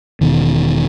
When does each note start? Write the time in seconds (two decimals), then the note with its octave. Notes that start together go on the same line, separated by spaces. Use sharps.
0.21 E1 C#2 B2 D#3